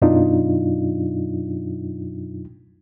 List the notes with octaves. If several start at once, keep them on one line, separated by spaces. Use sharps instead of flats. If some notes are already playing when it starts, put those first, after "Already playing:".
F#2 B2 F#3 D4 D#4 F4